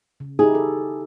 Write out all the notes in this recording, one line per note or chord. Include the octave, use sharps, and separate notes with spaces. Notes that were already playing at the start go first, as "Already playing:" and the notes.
C#3
D#4 E4 G4 G#4
A4